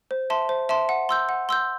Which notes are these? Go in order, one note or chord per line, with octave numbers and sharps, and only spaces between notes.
C5
E5 A5 C6
C5
E5 A5 C6
F#5
C6 E6 G6
F#5
C6 E6 G6